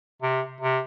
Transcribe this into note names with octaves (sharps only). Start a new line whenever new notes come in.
C3
C3